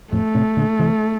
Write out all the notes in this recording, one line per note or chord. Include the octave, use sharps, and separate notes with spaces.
F2 A2 A3
A2 C3
A#2 D3
C3 E3